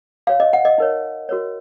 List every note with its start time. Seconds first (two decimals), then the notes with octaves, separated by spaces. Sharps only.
0.27 F#4 C#5 F5
0.40 D#5
0.53 F#5
0.65 D#5
0.78 D#4 A#4 C#5
1.29 F#4 A#4 C#5